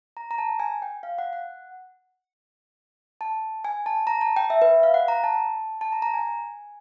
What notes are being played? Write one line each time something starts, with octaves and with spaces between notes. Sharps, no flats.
A#5
A#5
A5
G#5
G5
F5
F#5
F#5
A5
G#5
A5
A#5
A5
G5
E5
B4
F5
F#5
A#5
A5
A5
A#5
A#5
G#5